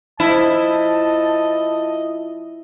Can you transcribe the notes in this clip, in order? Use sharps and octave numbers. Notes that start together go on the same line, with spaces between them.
F3 E4 D#5 A5